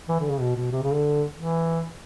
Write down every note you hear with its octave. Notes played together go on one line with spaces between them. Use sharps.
E3
D3
C#3
B2
B2
C3
C#3
D3
E3